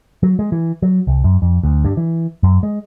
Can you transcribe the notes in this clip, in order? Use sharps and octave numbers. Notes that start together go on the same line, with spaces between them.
F#3
G#3
E3
F#3
C2
F#2
F2
D2
G2
E3
F#2
G#3